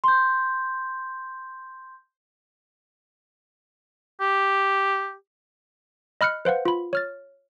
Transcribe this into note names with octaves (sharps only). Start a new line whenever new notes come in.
C6 G6
G4
D#5 B5 F6 F#6 C#7
B4 C5 F5 F#5
F4 B5
C#5 F6 A6